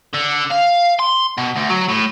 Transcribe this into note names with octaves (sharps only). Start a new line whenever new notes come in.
D3
F5
C6
B2
D2
F#3
A2